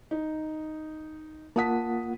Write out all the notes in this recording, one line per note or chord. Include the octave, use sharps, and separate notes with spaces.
D#4
A#3 F4 F#5 A5 D#6 B6